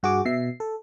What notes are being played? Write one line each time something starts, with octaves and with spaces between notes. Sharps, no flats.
G2 F#4 G#4 D6
B2 E5 C7
A4